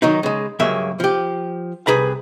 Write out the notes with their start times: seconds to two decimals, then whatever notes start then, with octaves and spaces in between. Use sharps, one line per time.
0.02 D#3 F#3 D#4
0.23 C#3 G#3
0.59 C#2 G2 F#3 A#3 G#4 E5
1.00 F3 G4
1.87 C2 G#4 B4 A#5